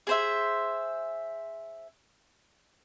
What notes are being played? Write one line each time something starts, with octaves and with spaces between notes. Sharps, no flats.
G#4 C5 E5